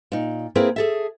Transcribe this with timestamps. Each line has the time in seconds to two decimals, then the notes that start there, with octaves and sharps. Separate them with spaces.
0.12 A#2 D#4
0.55 A#3 C4 E4 G#4 A#4 B4
0.76 G#4 A4 E5